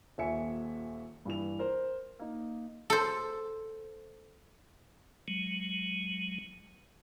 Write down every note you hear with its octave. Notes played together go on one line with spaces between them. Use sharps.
D#1 D#2 E5 G#5 C#7
G2 E3 F7
A#4 C5
A#3 D#4
A4 C5
F#3 G#3